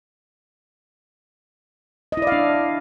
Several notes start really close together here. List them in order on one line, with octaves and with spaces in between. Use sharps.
D#5 E4 D5 F5 D4